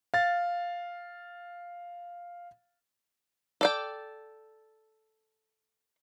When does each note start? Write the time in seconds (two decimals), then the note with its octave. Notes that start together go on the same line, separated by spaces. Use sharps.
0.14 F5 A6
3.61 A4 D5 G5